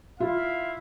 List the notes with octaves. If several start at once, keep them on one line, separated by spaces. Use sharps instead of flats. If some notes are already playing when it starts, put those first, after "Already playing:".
E4 F4 F5